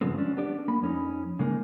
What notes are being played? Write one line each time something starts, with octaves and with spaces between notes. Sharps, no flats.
G2 C#3 F3 G#3 B3 C4
C#4 D4
B3 D4 G4 D5
A#3 B5
F2 C#4 D#4
C#3 G#3 A#3 D#4